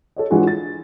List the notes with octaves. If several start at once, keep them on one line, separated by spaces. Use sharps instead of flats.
A4 C#5 D#5
E3 G#3 D4 F4 F#4 G#4
A6